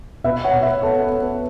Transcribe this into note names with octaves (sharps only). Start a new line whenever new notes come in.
B2 B4 E5
C#5 F#5
B2
B4 E5
B3 A4 C#5
B4
B3
B4